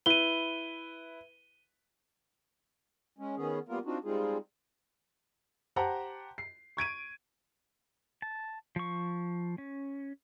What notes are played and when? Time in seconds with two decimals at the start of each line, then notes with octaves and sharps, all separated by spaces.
0.06 E4 B4 D#7 G7
3.18 G#3 C#4
3.37 D#3 B3 C#4 G#4
3.69 G3 A#3 B3 F4 A#4
3.86 C4 D4 D#4 F4 F#4
4.05 G3 G#3 C4 D#4 F4 G#4
5.76 G4 C5 F#5 A5 A#5
6.38 C7
6.77 C#6 G#6 D7 D#7
8.22 A5
8.76 F3 C#6
9.58 C#4